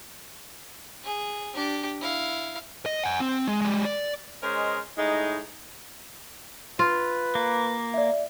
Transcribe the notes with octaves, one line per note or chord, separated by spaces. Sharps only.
G#4
D4 G4
E4 F5
D#5
F#5 G#5
C4
G#3
G3 G#3
D5
G#3 C#4 A#4 C5 D#5
A2 G#3 D#4
F4 B4
A#3
D5 E5